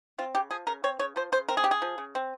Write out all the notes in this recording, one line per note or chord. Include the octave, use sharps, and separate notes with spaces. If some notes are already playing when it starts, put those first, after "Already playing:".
C4 F4
C#3 G4
F3 G#4
C#3 A#4
C4 C#5
C#3 C#5
F3 C5
C#3 C5
C4 A#4
G#4
C#3 G4
G#4
F3
C#3
C4